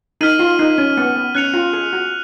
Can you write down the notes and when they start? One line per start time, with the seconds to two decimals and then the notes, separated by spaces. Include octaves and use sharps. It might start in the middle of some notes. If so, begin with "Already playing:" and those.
0.21 D#4 F6 B6 D#7 F#7
0.39 F4
0.59 D#4
0.78 C#4
0.97 B3
1.16 B3
1.35 C#4 F#6 C#7 F7
1.53 F4
1.73 G#4
1.93 F#4